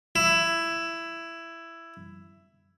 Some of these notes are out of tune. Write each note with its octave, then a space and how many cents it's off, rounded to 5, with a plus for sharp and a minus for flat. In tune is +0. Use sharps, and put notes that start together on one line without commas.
E4 +10